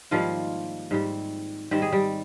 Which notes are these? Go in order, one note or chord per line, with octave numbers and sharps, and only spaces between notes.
G#2 D#3 F3 G3 A#3 F4
G#2 G3 C4
G#2 D#3 G3 C4 G4
G#4
G3 G4